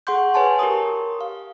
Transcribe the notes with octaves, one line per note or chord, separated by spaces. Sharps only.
G#4 F#5 C6 C#6 G6
B4 C#5 G#5 A5 C6
G4 A#4 C#6 D#6
F5